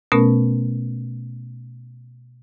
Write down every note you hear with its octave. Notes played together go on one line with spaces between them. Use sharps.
B2 A3 B3 C#4 A#4